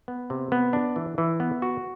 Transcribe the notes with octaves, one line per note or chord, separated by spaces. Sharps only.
B3
C3
B3
D4
E3
E3
B3
F#4